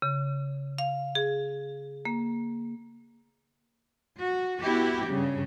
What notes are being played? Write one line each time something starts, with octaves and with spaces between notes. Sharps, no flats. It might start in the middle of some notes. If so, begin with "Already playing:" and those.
C#3
F5
G#4
A#3
F#4
B3 E4 F#4 G4
G2 C#3